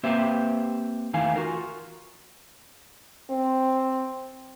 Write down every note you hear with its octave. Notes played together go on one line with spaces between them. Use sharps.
A#3 C4 G4 B4 C5 E5
E2 D#3 E3 A3 F5 G#5
F4 F#4 A#4
C4